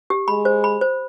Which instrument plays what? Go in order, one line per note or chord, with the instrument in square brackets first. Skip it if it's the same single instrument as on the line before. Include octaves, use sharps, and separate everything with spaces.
[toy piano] G4
[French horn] G#3 [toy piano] B5
[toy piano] C5
B5
C5